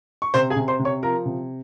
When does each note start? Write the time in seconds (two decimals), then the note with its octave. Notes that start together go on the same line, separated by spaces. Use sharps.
0.22 C#6
0.34 C3 C5 C6
0.50 G#4 G#5
0.56 C3
0.68 C5 C6
0.79 C3
0.85 C#5 C#6
1.03 F3 A#4 A#5
1.25 C3